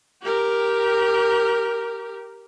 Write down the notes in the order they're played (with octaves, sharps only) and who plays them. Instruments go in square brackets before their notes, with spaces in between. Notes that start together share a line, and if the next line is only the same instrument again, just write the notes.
[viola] G4 A#4